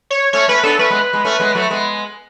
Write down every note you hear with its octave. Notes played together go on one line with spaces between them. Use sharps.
C#5
A3 C#4 C#5
A3 C#4 B4
B3 D4 A4
A3 C#4 B4
G#3 B3
G#3 B3
A3 C#4
G#3 B3
F#3 A3
G#3 B3